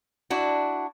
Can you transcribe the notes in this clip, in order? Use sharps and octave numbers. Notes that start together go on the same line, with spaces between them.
D4 E4 F#4